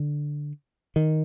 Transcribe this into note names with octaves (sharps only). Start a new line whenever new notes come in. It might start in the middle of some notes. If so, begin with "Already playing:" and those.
Already playing: D3
D#3